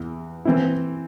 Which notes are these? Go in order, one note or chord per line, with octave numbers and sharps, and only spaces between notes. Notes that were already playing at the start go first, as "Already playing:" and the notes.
Already playing: E2 E3
E3 C4 E4